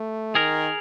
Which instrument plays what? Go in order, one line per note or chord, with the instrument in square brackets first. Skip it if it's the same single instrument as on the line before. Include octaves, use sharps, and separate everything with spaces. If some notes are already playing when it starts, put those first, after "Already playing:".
Already playing: [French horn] A3
[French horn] D#3 [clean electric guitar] G#4 A#4